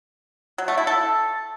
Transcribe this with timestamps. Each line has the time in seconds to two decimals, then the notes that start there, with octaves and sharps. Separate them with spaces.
0.58 F#3
0.68 A3
0.78 E4
0.87 A4